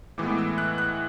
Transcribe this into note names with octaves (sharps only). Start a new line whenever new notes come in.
A2 E3 G#3 B3 D6
E6
F#6
F#6